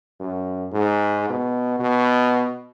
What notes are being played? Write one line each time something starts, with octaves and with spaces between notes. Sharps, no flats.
F#2
G#2
B2
B2